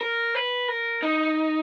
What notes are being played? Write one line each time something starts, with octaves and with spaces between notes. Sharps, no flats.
A#4
B4
A#4
D#4